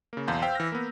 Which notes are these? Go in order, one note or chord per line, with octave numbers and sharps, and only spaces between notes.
C#3 A#3
B1 E2 F5 A5 C6 G6
C5 F5 G5 E6 B6
E3 F6 A#6
A#3 B3